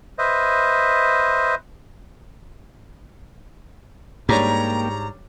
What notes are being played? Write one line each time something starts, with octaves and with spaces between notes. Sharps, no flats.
B4 C5 D#5 E5
G#2 G3 A#3 D4 G4 C#5 A#5